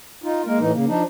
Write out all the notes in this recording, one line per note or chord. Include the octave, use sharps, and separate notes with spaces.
D#4 F4
G#3 A#3 A#4
A2 E3 D#4
C#3 A#3
F3 D4 D#4